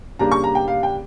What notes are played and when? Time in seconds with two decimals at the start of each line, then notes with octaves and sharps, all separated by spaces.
0.19 C#3 G3 A#3 D4 A#5
0.32 C#6
0.44 A#5
0.55 G5
0.68 F5
0.83 G5